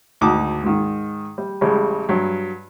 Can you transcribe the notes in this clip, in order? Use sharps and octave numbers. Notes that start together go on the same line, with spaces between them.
G#1 D2 D#4 A5 D6 D#6
G#2 D#3
G3
A1 C#3 G3 G#3
G2 F#3